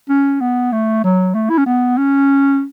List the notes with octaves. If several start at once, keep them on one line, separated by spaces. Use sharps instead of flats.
C#4
B3
A3
F#3
A3
E4
C#4
B3
C#4